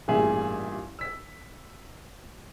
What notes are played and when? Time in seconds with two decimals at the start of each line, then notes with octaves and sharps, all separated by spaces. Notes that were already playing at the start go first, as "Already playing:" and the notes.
0.08 A1 G2 A#2 G#4 E5
0.99 E6 B6